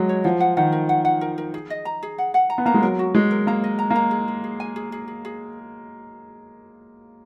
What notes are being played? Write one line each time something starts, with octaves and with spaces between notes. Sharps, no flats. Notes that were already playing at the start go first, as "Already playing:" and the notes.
Already playing: F#3 G#3
C#5
F3 F#5
F#5
D#3 F#5
A#4
F#5
F#5
A#4
A#4
G#4
D#5
A#5
G#4
F#5
F#5
A#5
B3
A#3 A#5
G#3
F#3 A#4
F#4
G#3 D#5
A#4
A#3 A#5
D#5
A#5
A#3
A#5
G#4
G#4
G#4
G#5
G#4
G#4
G#4
G#4